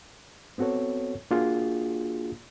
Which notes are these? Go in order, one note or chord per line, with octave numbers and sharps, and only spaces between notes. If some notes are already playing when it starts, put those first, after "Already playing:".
B3 C4 F#4 A4 C#5
A#3 D4 F4 F#4 G#4